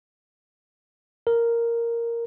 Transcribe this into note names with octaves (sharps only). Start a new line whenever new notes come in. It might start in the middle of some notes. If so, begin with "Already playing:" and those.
A#4